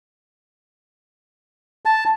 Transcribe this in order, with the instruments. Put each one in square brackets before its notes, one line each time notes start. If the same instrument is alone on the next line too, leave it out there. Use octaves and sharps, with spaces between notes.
[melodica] A5